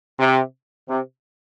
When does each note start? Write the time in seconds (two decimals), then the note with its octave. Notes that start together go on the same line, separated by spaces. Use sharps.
0.18 C3
0.88 C3